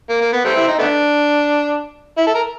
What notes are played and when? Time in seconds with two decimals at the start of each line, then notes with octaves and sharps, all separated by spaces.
0.10 A#3
0.21 A#3
0.33 B3
0.45 G3 A3 C4
0.56 E4
0.68 D#4
0.79 A3 B3 D4
2.18 E4
2.27 A4
2.35 A#4